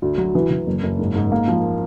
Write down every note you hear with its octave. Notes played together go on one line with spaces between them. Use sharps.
D2
F#3
E3
E3
F#1
F#1
G#2
G#2
A#3
F3